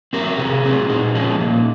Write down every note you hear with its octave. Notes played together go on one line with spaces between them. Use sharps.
F#3 C4 A#4
C3 G#4
F#3 C4
A#2 D#4
F3 G#3 C#4
A#2